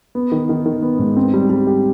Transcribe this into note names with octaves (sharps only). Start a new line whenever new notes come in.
B3
D#3
D#3
D#3
B3
G#2
C4
G3
G3
G4